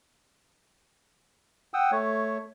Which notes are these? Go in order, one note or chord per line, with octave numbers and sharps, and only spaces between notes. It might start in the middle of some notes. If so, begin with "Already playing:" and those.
F#5 G5 D#6 E6
A3 C#5